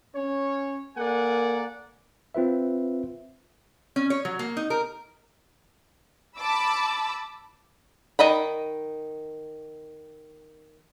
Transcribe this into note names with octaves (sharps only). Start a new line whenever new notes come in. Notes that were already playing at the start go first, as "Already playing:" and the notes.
C#4 C#5
A#3 A4 A#4 D5 F#5 G#5
C4 F4 B4 E5
C#4
C#5
F#3
A#3
D#4
A#4
A5 B5 D6 E6
D#3 D#5 A#5 B5